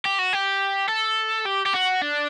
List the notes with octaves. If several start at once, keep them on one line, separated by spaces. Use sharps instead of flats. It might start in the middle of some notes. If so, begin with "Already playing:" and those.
G4
F#4
G4
A4
G4
G4
F#4
D4